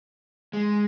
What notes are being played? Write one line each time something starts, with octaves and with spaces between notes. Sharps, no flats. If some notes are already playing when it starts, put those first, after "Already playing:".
G#3